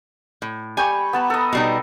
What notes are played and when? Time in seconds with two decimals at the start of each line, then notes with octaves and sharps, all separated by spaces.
0.42 A2
0.77 G3 G5 G#5 C#6
1.13 B3 A5 A#5
1.30 A4 D#5
1.53 B2 G3 D#4